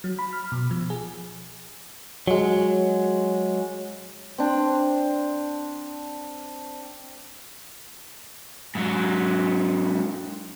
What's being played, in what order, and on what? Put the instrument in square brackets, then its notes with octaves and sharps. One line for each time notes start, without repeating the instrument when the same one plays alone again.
[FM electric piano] F#3
B5
F6
B2
F3
G#4
[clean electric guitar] F#3 G#3
[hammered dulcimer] C4 D4
[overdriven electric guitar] G#2 F#3